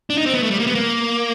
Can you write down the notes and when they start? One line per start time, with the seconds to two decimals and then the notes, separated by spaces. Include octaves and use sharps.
0.10 D4
0.18 D#4
0.26 C4
0.34 B3
0.43 A3
0.51 G3
0.59 A#3
0.67 B3
0.75 A#3